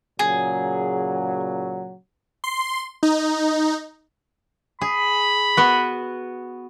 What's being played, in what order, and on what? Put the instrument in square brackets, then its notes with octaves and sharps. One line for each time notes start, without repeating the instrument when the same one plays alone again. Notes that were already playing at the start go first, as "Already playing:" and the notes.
[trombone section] A#2 C#3 F#3 [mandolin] G#4
[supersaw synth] C6
D#4
[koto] G#4 [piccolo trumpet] B5
[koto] B3 F#4